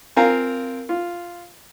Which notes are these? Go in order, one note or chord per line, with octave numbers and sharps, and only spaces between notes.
C4 F4 A#4 F5 G#5 A#5
F4